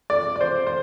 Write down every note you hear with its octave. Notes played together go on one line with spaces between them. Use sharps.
D5
D5
C5
C5